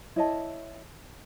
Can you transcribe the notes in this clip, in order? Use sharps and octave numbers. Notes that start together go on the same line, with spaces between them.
E4 C#5 D#5 A5